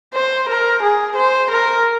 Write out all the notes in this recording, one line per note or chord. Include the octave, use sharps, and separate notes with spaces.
C5
A#4
G#4
C5
A#4